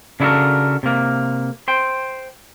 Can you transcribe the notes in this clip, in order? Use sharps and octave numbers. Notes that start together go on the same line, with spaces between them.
C#3 D4 E4 F#4 A4 A#4
C3 A#3
C5 G5